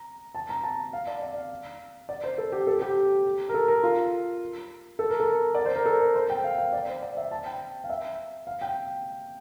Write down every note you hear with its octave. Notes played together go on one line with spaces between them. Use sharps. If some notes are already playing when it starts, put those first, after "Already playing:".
Already playing: A#5
A5
A#5
A5
F5
D5
D5
F5
D5
C5
A4
G4
A4
G4
A#4
A4
A#4
F4
A4
A#4
A4
D5
C5
A#4
A4
A#4
C5
G5
F5
F5
D5
C5
D5
E5
A5
G5
F5
E5
F5
G5